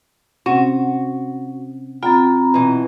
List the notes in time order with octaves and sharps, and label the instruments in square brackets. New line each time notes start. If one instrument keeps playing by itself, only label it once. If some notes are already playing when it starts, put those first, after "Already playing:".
[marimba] C3 C4 C#4 [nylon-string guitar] F#4
[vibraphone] C4 A#5 B5 [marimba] F4 A6 [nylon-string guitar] G5
[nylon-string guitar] B2 E3